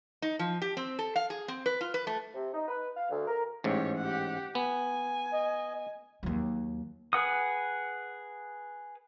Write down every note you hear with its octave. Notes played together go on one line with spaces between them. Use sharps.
D#4
F3
G4
C4
A4
F5
G#4
C4
B4
F4
B4
A3
C3
D#4
B4
F5
D2
A#4
A1 G#2 G4 C#5
G4 F#5
B3 G#5
D#5
D#2 F#3
G#4 B4 F#5 D#6